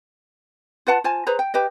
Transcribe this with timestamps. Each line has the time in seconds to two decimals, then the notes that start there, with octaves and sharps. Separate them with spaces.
0.87 F4 B4 F#5 A5
1.04 F4 C5 G#5 A5
1.27 G#4 B4 C5 A#5
1.39 G5
1.54 G4 B4 D#5